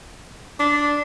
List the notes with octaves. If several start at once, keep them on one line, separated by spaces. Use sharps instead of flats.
D4